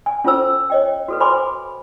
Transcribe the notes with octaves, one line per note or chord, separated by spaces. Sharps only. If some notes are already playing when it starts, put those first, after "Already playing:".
G#5
C#4 F4 A4 C5 E6
C#5 D#5 G5
F#4 A4 B4
C5 G#5 B5 C6 D6